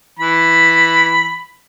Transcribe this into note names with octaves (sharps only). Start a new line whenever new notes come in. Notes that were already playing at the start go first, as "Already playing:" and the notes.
E3 B5